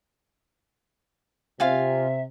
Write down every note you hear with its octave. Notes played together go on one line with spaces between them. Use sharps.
C3 F4 E5 F5 G#5